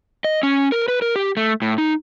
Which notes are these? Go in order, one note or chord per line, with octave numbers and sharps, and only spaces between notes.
D#5
C#4
A#4
B4
A#4
G4
A3
A2
D#4